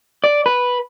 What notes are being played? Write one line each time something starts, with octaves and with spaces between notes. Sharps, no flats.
D5
B4